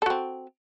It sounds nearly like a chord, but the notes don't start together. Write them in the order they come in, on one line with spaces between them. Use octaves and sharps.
A4 F#4 C4